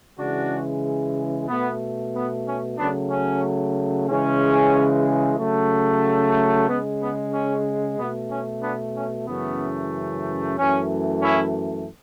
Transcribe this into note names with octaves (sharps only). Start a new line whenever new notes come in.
C#3 E3 G#3 D4 F#4
B2 A3 B3
B3
C#4
C#3 F#3 A3 B3 D4
C#4
C#3 E3 G#3 C#4
C#3 F#3 A3
C#3 G#3 B3
B3
C#4
B2 A3 B3
C#4
B3 D4
C#4
F#2 C#3 E3 A3 B3
F#2 E3 A3 C#4
C#4 E4